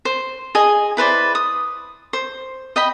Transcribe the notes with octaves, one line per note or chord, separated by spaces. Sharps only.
C5
G#4 D#5 G#5
E4 B4 C5 D5
D#6
C5
D#5 G5 B5